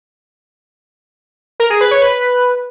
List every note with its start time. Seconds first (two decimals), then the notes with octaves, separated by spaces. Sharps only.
1.60 A#4
1.70 G#4
1.81 B4
1.91 C#5
2.02 B4